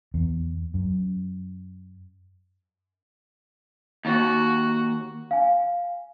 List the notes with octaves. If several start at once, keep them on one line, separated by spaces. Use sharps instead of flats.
E2
F#2
D#2 F#4
F5 G#5